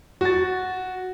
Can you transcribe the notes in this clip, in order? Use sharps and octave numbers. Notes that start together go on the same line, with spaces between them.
F#4 A6